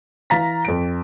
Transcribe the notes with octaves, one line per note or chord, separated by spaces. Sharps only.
E3 F5 A#5 A6 B6
F2 D7